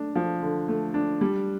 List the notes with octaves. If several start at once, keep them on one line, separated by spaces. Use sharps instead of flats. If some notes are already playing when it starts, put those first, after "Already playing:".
Already playing: A3 D4
F3
D3
A3
D4
G3